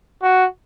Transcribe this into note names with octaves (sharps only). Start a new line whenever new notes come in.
F#4